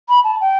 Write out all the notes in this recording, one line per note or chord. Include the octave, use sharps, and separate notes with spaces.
B5
A5
G5